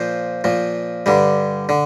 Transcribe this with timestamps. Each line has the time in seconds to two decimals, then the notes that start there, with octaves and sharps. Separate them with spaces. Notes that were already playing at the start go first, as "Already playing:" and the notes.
Already playing: A#2 F3 C5
0.44 A#2 F3
1.06 G2 D3 G3
1.69 D3